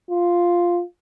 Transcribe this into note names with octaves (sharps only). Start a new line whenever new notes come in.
F4